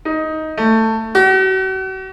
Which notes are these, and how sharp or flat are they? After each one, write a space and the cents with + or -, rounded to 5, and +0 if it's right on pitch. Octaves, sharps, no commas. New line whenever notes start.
D#4 +10
A3 +15
F#4 +40